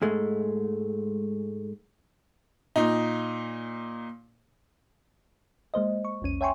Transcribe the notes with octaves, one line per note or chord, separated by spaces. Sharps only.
G#2 G#3 A3
A#2 D#4
G#3 A#3 C5 D#5
C#6
A#1 E2 C#4 D#7
C#5 E5 G5 G#5 C6 C#6